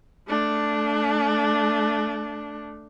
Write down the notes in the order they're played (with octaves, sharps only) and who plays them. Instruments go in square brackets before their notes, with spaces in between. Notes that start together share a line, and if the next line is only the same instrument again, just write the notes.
[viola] A3 D4